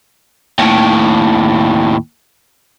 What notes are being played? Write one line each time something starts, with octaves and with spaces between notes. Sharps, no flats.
D#2 A2